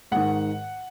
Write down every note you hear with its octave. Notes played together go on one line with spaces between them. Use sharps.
G#2 D#3 F#5